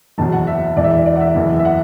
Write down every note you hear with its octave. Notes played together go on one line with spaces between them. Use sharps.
F#1 E2 B2 F#3 A5
F#5
E5
E1 E2 E3 D5
E5
D5
D5
F#5
E5
F#1 E2 E3
E5
F#5